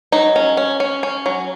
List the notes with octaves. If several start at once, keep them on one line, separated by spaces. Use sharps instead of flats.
F#3 D#4
C#4
C#4
C#4
C#4
F#3